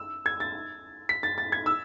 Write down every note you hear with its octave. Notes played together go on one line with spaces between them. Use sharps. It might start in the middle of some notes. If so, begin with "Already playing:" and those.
Already playing: E6
G#6
A6
B6
A6
A6
G#6
E6